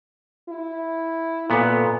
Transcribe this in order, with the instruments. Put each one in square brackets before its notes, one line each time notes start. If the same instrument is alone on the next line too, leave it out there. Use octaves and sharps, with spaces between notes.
[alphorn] E4
[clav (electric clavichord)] A#2 B3 [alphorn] A4